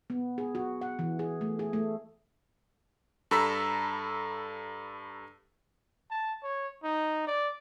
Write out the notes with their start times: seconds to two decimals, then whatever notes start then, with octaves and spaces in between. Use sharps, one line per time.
0.10 B3
0.38 G#4
0.55 F#4
0.81 F#5
0.99 E3
1.19 G#4
1.41 A3
1.59 G#4
1.73 A3
3.31 G2 A4 A#5 B5 E6 B6
6.10 A5
6.43 C#5
6.83 D#4
7.27 D5